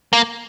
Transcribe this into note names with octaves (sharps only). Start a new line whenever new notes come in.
A#3